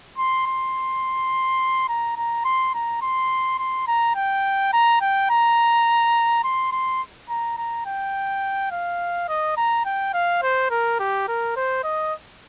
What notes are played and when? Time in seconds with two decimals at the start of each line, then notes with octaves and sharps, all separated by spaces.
0.18 C6
0.47 C6
1.89 A#5
2.17 A#5
2.45 C6
2.74 A#5
3.02 C6
3.59 C6
3.88 A#5
4.16 G5
4.73 A#5
5.01 G5
5.30 A#5
6.44 C6
6.72 C6
7.29 A#5
7.57 A#5
7.86 G5
8.71 F5
9.28 D#5
9.57 A#5
9.85 G5
10.13 F5
10.42 C5
10.70 A#4
11.00 G4
11.28 A#4
11.56 C5
11.84 D#5